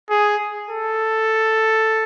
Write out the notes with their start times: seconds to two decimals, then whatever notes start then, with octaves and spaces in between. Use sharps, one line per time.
0.10 G#4
0.70 A4